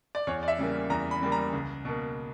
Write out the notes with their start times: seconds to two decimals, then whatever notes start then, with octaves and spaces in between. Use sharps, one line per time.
0.15 D5
0.27 E2 C#5
0.43 D5
0.48 E5
0.59 C#3 G3 A#3
0.90 E2 A#5
1.11 B5
1.22 C#3 G3 A#3
1.32 A#5
1.53 C#2
1.85 B2 A#3